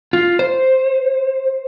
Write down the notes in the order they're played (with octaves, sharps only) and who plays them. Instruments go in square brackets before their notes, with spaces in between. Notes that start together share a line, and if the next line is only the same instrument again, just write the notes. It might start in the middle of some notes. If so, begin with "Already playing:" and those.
[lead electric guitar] F4
C5